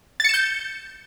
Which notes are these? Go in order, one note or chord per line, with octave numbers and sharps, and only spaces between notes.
G6 A6 C#7 E7